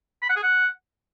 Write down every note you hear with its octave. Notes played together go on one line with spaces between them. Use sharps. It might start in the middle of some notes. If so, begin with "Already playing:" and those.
B5
F#5
G#4
F#5